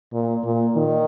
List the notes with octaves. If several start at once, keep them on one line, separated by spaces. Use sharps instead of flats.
A#2
A#2
D#3